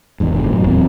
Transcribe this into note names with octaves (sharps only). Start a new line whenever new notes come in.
G1 E2 G#2
F#1 G#2 B2 D3
F#2 A2 C3 F#3
D1 E2 A#2 C4